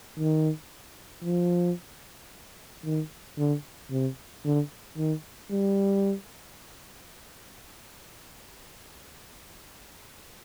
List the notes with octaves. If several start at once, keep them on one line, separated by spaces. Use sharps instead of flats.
D#3
F3
D#3
D3
C3
D3
D#3
G3